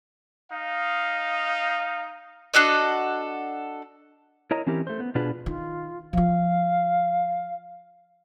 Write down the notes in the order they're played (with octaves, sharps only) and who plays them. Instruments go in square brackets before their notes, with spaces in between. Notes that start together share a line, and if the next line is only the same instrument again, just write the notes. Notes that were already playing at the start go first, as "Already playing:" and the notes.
[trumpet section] D#4 D#5 F5
[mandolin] D4 F#4 A4 D#5
[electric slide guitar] E4 A#4 C#5 D#5 A#5
E3 C4 C#4 E4 G4 A#4
A3 C5
B3
B2 D4 F4 G#4 B4
[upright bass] D#3 [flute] F4
[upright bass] F3 F4 [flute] F5